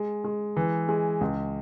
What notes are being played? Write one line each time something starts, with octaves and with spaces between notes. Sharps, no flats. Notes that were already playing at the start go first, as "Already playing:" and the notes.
Already playing: G#3
G#3
E3
G#3
C#2